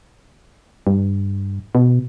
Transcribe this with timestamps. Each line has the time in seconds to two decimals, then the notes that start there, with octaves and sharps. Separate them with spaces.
0.87 G2
1.75 B2